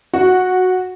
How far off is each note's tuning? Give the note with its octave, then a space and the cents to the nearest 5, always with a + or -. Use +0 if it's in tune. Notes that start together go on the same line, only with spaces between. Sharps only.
F#4 -5